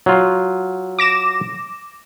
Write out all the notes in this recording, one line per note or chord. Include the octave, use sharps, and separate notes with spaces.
F#3 F4
D6 A#6 E7